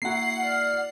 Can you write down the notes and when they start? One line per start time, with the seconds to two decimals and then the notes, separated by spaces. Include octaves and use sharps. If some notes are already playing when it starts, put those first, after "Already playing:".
0.02 A#3 E4 F#4 F#5 C7
0.42 D5 F6